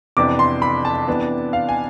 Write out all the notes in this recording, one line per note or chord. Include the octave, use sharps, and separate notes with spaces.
F2 C3 E3 B3 D4 D6
C6
B5
A5
C3 E3 B3 D4
F5
G#5